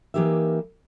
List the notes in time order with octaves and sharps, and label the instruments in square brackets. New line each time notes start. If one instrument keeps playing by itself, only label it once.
[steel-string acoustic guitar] E3 A#3 D#4 G4 A#4 E5